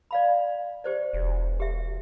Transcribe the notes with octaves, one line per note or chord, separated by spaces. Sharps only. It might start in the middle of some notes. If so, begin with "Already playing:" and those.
D5 F5 B5
G4 C5 D5
E1
G4 E5